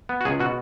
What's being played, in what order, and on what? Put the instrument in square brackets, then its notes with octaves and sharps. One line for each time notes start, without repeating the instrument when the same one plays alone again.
[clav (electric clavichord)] B3
F#4
C#2 G#4
B2 F#4